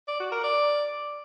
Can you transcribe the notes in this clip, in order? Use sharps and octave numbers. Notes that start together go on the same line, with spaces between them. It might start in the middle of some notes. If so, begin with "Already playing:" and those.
D5
F#4
A#4
D5